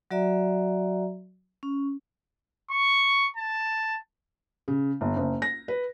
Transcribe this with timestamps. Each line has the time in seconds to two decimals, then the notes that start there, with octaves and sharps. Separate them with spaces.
0.11 F#3 F#4 D5 E5 A#5
1.63 C#4
2.71 C#6
3.37 A5
4.68 C#3
5.01 G1
5.16 F#1
5.42 A#6
5.68 B4